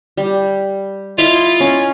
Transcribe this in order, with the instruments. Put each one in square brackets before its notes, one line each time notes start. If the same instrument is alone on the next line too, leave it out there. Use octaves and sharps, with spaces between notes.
[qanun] G3
[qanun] E4 D#5 [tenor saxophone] F4
[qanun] C#4